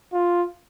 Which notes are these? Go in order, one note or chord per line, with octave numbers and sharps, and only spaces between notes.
F4